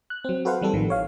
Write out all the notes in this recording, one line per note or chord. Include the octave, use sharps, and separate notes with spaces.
F#6
F#3 C4
F#4 A4 B4 C5 F5 F#5
E3 G3 C4 A4
A1 D#3 F3
C#5 F5